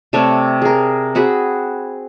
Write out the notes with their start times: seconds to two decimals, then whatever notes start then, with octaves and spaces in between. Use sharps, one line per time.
0.13 C3 A3 D4 C#5
0.62 G#4 A#4
1.15 C4 F#4 G#4 B5